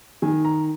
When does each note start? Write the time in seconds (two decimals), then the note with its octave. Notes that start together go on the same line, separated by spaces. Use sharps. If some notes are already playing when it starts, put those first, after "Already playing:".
0.22 D#3 G#5
0.45 A#5